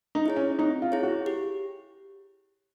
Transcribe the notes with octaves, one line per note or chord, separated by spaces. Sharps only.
D#4
E4 G#4 C#5
C#4
C4 D#4
F4
E4 G#4 C#5
F#4
G4